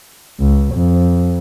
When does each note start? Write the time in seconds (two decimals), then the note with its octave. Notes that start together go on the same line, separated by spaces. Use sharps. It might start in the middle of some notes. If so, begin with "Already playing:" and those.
0.40 C#2
0.74 F2